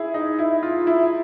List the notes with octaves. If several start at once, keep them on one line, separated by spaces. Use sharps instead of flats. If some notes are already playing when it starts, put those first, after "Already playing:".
Already playing: E4 G#4
D#4
E4
F4
E4